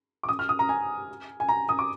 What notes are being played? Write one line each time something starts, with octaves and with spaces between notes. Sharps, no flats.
D6
D#6
F6
D#6
A#5
G#5
G#5
A#5
D#6
D6